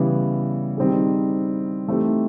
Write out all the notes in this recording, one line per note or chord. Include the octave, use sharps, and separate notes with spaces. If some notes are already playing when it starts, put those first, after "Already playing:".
Already playing: C#3 E3 G3 B3
D#3 G3 C4 D#4 G#4
E3 A3 C4 D#4 G4